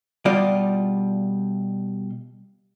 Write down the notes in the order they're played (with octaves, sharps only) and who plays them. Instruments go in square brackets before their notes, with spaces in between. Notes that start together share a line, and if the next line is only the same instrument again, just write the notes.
[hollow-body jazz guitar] B2 G3 F4 D5